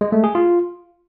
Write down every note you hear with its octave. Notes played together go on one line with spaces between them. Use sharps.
G#3
A3
G#4
F4